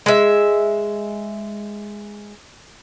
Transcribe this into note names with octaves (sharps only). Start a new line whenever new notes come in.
G#3 E5